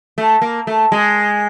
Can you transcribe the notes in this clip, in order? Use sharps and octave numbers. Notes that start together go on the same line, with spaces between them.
A3
A#3
A3
G#3